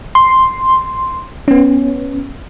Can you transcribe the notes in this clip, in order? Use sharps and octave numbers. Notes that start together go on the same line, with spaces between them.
C6
B3 C#4